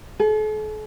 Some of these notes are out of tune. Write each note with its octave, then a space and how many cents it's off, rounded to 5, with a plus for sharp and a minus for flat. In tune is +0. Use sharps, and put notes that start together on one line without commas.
A4 -45